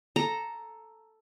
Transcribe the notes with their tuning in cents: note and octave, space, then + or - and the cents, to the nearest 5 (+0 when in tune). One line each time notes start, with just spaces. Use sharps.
A4 +0 A#5 +0